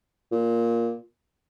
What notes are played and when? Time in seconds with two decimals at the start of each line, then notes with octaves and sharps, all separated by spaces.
0.31 A#2